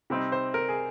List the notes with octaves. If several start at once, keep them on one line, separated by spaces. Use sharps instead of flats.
C3 G3 C4 D#4
C5
A#4
G#4